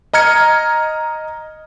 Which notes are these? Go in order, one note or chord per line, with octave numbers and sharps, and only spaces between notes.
D#5 A#5 F6 G#6 C#7